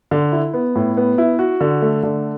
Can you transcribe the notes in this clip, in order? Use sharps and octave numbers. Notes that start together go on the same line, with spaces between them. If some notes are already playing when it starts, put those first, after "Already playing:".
D3
E4
B3
A2
B3
E4
F#4
D3
A3
D3